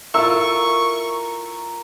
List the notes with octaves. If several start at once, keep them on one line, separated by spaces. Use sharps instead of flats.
E4 F4 A#4 C#6 E6